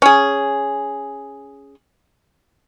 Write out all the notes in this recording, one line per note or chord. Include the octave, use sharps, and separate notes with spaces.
C#4 G#4